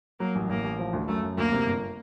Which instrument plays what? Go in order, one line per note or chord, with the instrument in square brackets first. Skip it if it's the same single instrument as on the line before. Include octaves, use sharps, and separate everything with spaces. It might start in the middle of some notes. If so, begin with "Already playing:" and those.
[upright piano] F#3 [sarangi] A#3
[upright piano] A1
[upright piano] A1 [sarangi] A#3
[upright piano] A1
F3
D2
[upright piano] F#2 [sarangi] A3
[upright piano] F#2
[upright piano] D2 [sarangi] A#3
[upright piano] C3
G1